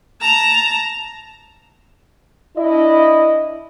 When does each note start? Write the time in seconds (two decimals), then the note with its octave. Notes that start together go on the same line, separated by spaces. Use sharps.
0.21 A5 A#5
2.57 D4 E4 D#5